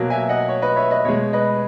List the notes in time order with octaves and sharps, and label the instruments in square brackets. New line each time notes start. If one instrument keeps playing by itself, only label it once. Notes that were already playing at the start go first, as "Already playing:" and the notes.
Already playing: [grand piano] B2 F#3 A#3
E5 G#5
D#5 F#5
C#5
B4 D#5
C#5 E5
B4 D#5
B2 G#3 C#5
B4 D#5